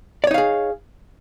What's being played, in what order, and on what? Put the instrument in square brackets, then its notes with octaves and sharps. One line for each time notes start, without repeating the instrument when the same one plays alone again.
[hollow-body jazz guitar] D5
C#5
D#4
F5
G#4